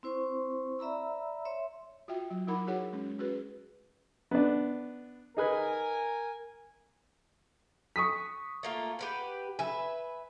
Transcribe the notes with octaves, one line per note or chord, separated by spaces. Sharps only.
C4 E4 C5 C6 C#6
D5 E5 A#5 B5 E6
C#5 E5 C6
F4 F#4 E5 G5
F#3
F#3 D#4 E4 A#4 F#5 B5
E4 F#4 G#4 C#5 F#5
G#3 C#4
C#4 F#4 G#4 B4
B3 D4
D#4 G#4 A#4 B4 G#5
C#6 D#6 B6
A3 A#3 F4
G4 B4 F#5
B4 E5 G#5